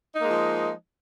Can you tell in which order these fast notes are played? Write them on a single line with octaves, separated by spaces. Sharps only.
D#4 A#3 G#3 F3